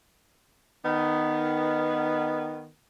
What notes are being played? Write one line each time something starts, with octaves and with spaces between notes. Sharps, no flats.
D#3 B3